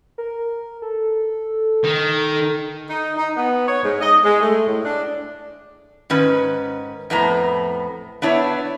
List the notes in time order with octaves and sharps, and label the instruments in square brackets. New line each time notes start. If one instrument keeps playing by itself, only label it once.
[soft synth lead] A#4
A4
[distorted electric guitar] D#3
[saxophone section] D#4
D#4
B3
C#5
G#2
D#5
G#3
A3
A2
D4
[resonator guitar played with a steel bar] G#2 D#3 C#4 B4
F2 A2 B3 A#5
B3 D4 E4 C#5